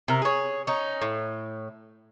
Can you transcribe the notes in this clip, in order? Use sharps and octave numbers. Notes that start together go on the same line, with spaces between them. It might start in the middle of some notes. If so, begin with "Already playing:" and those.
C3 A#4
G#4 C#5
C#4 D#4
A2